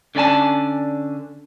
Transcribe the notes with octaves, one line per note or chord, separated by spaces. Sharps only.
D3 C#4 D5 G#5 A5